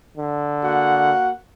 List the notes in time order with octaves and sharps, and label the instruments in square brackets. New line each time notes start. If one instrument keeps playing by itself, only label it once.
[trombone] D3
[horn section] A#3 F#4 F#5